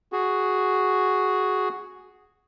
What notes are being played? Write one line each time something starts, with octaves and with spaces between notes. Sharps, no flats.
F#4 G#4